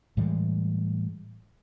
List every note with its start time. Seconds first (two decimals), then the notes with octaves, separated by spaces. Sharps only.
0.17 A2 E3 G3 G#3